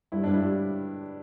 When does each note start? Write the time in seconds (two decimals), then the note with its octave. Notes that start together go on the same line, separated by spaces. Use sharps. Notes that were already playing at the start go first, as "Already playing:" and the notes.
0.12 G2 E4
0.23 G2 D4
0.34 E4
0.42 G3